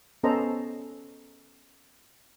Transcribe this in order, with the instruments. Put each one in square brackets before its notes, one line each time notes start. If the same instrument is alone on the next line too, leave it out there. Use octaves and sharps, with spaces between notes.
[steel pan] B3 C#4 A4 C5 D#5 A#5